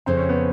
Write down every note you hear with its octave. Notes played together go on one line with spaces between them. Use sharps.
F2 C#3 F3 C4
C#4
B3